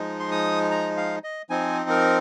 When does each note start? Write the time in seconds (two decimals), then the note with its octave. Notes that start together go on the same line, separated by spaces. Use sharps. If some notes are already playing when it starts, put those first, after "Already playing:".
Already playing: F3 G#3 D#4
0.20 C6
0.31 D#6
0.71 A#5
0.97 F5
1.24 D#5
1.50 F3 C4 D#4 G#5
1.90 A#4